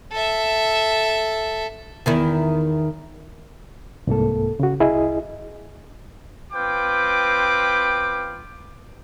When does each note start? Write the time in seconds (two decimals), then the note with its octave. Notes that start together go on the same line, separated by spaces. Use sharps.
0.12 A4 E5
2.06 E2 D#3 E4
4.07 C2 G#2 A#3 A4
4.60 C#3 F#4
4.80 C2 E4 G#4 D#5
6.53 C4 F4 B4 G5 D6